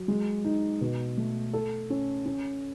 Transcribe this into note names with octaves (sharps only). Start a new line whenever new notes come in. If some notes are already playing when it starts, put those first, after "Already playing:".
Already playing: F#3
G#3
D#4
B2
A3
A4
C#4
C#4